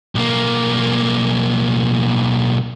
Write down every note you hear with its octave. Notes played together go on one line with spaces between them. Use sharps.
B1 A#3